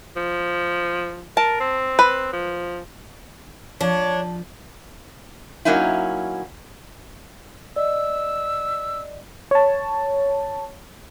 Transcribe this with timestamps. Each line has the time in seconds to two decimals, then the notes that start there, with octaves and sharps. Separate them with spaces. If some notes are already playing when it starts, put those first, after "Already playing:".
0.16 F3
1.37 A#4 A5
1.60 C4
1.99 B4
2.33 F3
3.81 F3 D4 C#5
5.65 F#3 A#3 C#4 D#4 E4
7.76 D5 D#5 E6
9.51 C#5 A5